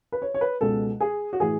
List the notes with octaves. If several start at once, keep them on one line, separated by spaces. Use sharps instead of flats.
B4
C#5
C#5
B4
C#2 B2 G#3 A4
G#4
F#4
A2 E3 G#4